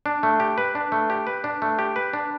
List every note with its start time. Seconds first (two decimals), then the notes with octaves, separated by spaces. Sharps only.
0.06 D4
0.23 A3
0.40 G4
0.58 B4
0.75 D4
0.92 A3
1.10 G4
1.27 B4
1.44 D4
1.62 A3
1.79 G4
1.96 B4
2.13 D4